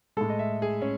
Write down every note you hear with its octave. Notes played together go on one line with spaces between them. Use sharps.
A2 G#3 A4
D#5
E5
G#4
C#4